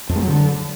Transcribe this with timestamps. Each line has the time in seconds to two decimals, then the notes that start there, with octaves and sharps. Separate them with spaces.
0.09 F2
0.16 G#3
0.22 F#3
0.28 D3